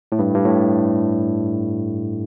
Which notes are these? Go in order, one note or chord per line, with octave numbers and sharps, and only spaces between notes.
A2
G2
G2
A2